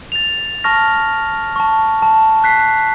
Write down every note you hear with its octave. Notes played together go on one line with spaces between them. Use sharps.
A6 F7
A5 C#6 F6 A#6
A5 C#6
A5
F#6 B6 C7